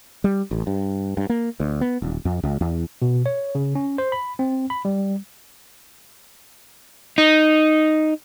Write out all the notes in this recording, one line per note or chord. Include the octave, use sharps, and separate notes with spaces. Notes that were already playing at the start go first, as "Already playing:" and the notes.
G3
A1
G2
G2
A#3
D2
B3
D#1
F2
C#2
E2
B2
C#5
C#3
C#4
C5
B5
C4
B5
G3
D#4